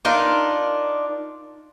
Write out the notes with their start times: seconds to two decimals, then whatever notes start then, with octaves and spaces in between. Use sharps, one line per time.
0.05 D4 D#4 F4 A#4